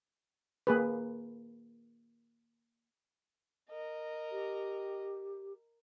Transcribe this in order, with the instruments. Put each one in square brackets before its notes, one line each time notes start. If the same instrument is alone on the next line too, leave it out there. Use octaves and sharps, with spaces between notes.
[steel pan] A#3 G#4 B4
[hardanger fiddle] A#4 D#5
[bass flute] G4